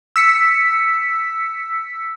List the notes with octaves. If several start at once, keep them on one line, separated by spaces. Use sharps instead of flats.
E6 B6 C#7